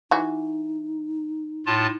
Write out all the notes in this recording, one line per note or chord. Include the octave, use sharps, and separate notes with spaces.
E3 D#4 F#4
A2 F4 A5